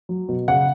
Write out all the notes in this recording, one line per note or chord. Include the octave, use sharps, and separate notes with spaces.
F#3
B2
C#3 F#5